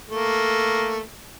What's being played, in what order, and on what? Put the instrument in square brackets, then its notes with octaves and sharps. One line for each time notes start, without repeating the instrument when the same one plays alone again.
[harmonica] A3 A#3